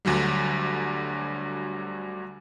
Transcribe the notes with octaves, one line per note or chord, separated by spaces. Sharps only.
D2 D3 F#3 G3